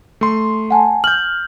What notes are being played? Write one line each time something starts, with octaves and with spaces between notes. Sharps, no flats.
A3 C6
F#5 G#5 A5
F6 G6 F#7